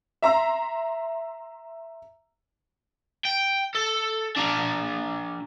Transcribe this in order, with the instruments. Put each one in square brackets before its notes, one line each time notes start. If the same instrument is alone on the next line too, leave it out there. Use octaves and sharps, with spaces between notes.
[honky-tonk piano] E5 A#5 C6 E6
[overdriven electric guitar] G5
A4
A#3 D4